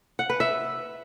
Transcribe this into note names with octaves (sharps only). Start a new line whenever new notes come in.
F#5
B4
E5